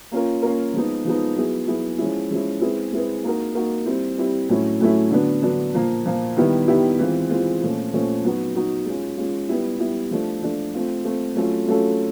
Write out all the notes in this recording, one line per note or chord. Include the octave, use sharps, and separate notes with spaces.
A#3 C#4 F4 A#4
A#3 C#4 F4 A#4
F3 G#3 B3 D#4
F3 G#3 B3 D#4
F#3 B3 E4 G#4
F#3 B3 E4 G#4
F3 G#3 C#4 E4
F3 G#3 C#4 E4
G#3 C4 E4 G#4 B4
G#3 C4 E4 G#4 B4
A#3 D#4 F#4 A#4
A#3 D#4 F#4 A#4
G3 C4 E4
G3 C4 E4
A2 F#3 A3 C#4 E4
A2 F#3 A3 C#4 E4
D3 F#3 B3 D4
D3 F#3 B3 D4
A#2 F3 A#3
A#2 F3 A#3
D#3 G3 B3 E4 G4
D#3 G3 B3 E4 G4
E3 G#3 C4 F4
E3 G#3 C4 F4
A#2 F3 A3 C#4
A#2 F3 A3 C#4
F#3 B3 D#4 F#4
F#3 B3 D#4 F#4
G#3 C#4 F4
G#3 C#4 F4
G3 B3 E4 G4
G3 B3 E4 G4
F3 A3 D4
F3 A3 D4
A3 C4 F4
A3 C4 F4
F#3 A3 C#4 F4 A4
F#3 A3 C#4 F4 A4